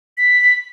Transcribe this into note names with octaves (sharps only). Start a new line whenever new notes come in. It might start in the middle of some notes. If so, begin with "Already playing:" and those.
B6